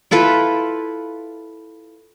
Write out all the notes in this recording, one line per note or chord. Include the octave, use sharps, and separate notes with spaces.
E4 F4 A4 B4